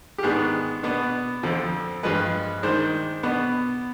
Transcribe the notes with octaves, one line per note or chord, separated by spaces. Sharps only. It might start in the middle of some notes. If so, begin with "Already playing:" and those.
G4
G#2 D#3 B3 D4 G#4
B2 B3 D4
F2 D3 F3 C4
G2 F3 G#3 B4
D#3 G#3 D4 C5
B2 B3 D4